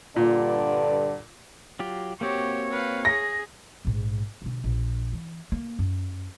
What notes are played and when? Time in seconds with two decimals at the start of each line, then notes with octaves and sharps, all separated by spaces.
0.16 G2 A#2 D3 D5
1.79 F#3 F4 G4
2.21 A#3 C4 F#4 G4 C#5
2.71 B4 F5
3.05 G#4 A#6
3.85 A#1 G#2
4.42 B2 D3
4.64 A#1
5.13 E3
5.52 A#3
5.79 F#2